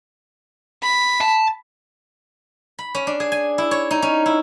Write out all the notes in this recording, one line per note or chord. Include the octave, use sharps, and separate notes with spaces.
B5
A5
B5
C#4
D4
G#4
G#5
E4
C#5
D#4
C#4
E4